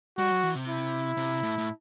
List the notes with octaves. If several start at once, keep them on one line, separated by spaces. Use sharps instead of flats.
G3 F#4
F#3
E3
C3
E4
C3
A2
A2